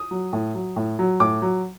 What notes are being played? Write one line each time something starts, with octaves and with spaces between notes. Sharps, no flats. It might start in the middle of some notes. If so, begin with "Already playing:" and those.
Already playing: D#6
F#3
A2
F#3
A2
F#3
A2 D6
F#3